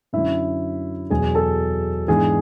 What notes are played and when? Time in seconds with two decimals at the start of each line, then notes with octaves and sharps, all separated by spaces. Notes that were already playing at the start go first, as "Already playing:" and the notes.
0.13 F#2 D3 F#3 E4 E5
1.10 E2 B2 F#3 G#4 G#5
1.35 A4 A5
2.08 G#2 E3 B3 D4 G#4 G#5